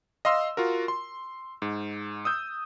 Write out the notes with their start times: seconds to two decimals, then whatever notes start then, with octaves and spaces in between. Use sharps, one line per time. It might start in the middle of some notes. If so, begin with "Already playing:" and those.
0.25 D#5 F5 C6 E6
0.57 F4 F#4 A#4
0.88 C6
1.62 G#2
2.25 D#6 E6 G6